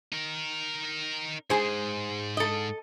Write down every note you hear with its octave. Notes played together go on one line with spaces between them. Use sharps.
D#4 A#4
G#2 G#3 G#4 C5
A4 D#5